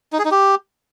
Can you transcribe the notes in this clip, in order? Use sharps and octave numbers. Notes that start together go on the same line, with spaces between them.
D#4
G#4
D#4
G4